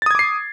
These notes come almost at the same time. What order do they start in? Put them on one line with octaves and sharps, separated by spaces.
A6 D#6 G#6 D6 C7